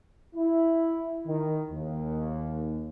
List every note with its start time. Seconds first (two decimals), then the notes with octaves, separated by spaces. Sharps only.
0.35 E4
1.26 D#3
1.70 D#2